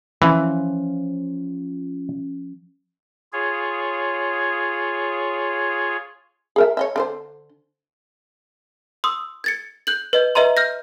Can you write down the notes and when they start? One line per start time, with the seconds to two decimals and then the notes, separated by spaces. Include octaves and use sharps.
0.22 E3 F3 C#4
3.33 F4 G#4 C#5
6.56 G#4 A#4 E5
6.77 C#5 D#5 E5
6.96 D3 D4 C5
9.04 C6 D#6 E6
9.44 G#6 A6 C#7
9.87 F#6 G6 F#7
10.13 B4 D#5 G6
10.35 B4 D#5 E5 A#5 C6
10.57 F6 G6 A#6